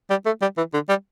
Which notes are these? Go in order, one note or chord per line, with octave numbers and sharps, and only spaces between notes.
G3
A3
G3
E3
D3
G3